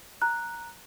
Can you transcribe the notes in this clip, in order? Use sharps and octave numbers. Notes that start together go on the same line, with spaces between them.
A#5 F#6